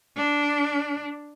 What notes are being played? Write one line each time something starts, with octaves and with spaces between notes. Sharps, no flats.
D4